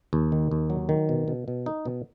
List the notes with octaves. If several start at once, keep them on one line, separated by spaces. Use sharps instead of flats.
D#2
D#3
D#2
F#3
D#3
B2
B2
B2
D#4
B2